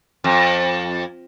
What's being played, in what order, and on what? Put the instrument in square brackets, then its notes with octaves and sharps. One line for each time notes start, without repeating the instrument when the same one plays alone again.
[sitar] F2